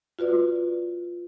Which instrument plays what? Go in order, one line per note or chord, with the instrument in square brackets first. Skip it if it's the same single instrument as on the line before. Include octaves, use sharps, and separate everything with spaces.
[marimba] F4 F#4 B4 D5